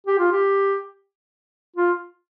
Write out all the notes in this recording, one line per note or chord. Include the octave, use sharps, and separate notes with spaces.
G4
F4
G4
F4